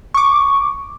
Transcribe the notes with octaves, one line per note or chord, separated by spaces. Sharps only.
C#6 D6